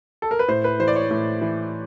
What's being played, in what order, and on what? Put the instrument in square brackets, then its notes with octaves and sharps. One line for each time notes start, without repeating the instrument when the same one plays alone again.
[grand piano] A4
A#4
B4
A2 C5
B4
E3 C5
D5
C#5
A2
E3